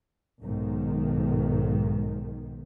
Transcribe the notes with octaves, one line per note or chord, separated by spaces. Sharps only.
B1 G#2 D#3